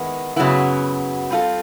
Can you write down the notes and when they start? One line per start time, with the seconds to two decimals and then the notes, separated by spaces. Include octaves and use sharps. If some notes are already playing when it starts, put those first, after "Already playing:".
Already playing: D#3 G#3 B3 E4
0.36 F#2 C#3 F#3 B3 E4
1.30 G3 C4 F4 A4